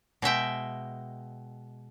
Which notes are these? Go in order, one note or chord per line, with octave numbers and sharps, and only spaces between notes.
B2 G#3 E5 G5